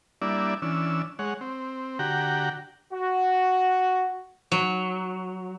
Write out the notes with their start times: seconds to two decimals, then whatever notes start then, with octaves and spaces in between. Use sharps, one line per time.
0.22 G3 A#3 D4 E4 D5 E5
0.62 E3 C#4 D4 E6
1.19 G#3 C#5 F#5
1.41 C4
1.99 D3 F#4 G4 F#5 G5 A#5
2.92 F#4
4.52 F#3